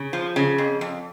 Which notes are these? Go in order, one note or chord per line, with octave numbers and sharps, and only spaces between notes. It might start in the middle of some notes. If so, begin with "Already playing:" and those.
Already playing: C#3
F3
C#3
F2
F2